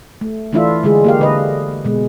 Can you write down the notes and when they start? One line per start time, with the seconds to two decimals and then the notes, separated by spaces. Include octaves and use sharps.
0.21 A3
0.53 E3 A3 D4 E4 F4 E5
0.83 D3 G#3 F4 G#4
1.04 A#3 G4 F5
1.19 D3 B4 D#5
1.85 B2 G#3